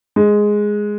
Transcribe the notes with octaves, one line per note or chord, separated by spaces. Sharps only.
G#3